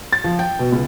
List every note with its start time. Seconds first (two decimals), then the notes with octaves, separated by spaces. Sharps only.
0.13 A6
0.24 F3
0.39 G5
0.59 B2
0.72 C#2